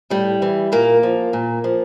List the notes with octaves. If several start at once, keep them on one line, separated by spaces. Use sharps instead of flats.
A2 G3
E3
A#2 A#3
F3
A#2
F3